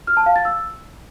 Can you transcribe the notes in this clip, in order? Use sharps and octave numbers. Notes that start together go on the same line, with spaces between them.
F6
A5
F5
A6
E6